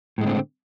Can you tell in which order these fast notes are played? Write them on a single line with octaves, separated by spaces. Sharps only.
A2 G#3 D3 C4